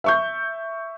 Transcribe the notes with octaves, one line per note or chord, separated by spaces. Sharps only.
E5 C#6 G6